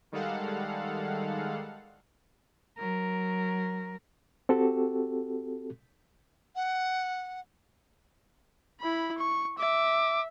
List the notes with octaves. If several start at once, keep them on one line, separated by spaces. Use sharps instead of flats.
D#3 G3 G#3 A4 F5 F#5
F#3 A#4
C4 F#4 G4 A4
F#5
E4 B5
C#6
E5 D6